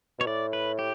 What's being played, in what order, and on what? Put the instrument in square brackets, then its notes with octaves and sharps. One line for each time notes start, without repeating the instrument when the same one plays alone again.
[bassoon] B2 [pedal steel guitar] C#5
[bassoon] A2 [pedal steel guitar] D5
[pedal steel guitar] B4
G4